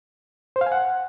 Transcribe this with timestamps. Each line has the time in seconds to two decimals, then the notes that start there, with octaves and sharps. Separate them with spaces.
0.56 C5
0.61 F5
0.67 G#5
0.72 F#5